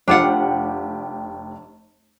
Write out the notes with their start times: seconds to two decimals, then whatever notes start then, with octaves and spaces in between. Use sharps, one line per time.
0.08 F1 D4 F4 G4 F#5 G5